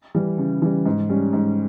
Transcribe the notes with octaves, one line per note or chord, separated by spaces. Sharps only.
E3 G3
C#3
E3 G3
G#2
G3 C#4
G#2